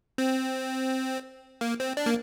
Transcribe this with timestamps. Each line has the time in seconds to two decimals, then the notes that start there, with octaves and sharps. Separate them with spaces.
0.18 C4
1.61 A#3
1.80 C4
1.97 D4
2.06 A#3